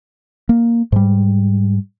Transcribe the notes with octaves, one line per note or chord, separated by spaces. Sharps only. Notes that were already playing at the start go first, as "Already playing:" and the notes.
A#3
G#2 G3